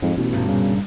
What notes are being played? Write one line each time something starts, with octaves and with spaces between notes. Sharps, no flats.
F2 G#2
A1 B2
E2 G2 A#2
C#3